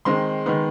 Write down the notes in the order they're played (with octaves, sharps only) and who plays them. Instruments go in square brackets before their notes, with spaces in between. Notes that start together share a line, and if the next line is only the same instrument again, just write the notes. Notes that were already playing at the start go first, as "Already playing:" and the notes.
[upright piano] D#3 G#3 C4 D#4 C6
D#3 G#3 B3 D#4